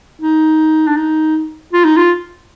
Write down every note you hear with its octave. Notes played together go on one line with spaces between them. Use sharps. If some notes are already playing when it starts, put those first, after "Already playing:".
D#4
D4
D#4
F4
D#4
F4